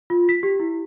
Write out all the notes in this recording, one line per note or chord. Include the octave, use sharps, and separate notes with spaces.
F4
B6
G4
E4